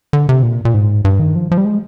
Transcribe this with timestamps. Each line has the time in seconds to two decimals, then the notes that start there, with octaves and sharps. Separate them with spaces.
0.13 D3
0.29 C3
0.43 A#2
0.65 A#2
0.74 G#2
1.05 G2
1.19 D#3
1.35 F3
1.51 F3
1.58 G3
1.65 G#3